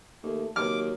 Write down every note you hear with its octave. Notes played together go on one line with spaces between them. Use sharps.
D#2 A3
D#2 F#3 D6 F6